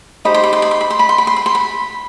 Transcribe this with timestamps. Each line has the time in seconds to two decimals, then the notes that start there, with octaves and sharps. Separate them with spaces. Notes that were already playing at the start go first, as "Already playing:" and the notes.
0.25 D#4 G4 C5 D#5 B5
0.34 C6
0.44 B5
0.53 C6
0.62 B5
0.71 C6
0.81 B5
0.90 C6
0.99 B5
1.09 C6
1.18 B5
1.27 C6
1.36 B5
1.46 C6
1.55 B5